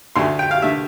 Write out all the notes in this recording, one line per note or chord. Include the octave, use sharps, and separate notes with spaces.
D2 D3 A3 C6
G5
F5
D3 A3 E5